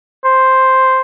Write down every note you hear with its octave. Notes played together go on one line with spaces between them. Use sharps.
C5